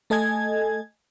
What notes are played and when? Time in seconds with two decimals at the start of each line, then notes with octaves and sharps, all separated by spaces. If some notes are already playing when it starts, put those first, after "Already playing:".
0.10 A3 A4 D#5 G#5 G#6